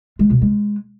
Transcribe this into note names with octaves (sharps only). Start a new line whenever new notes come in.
G#3
B2
G#3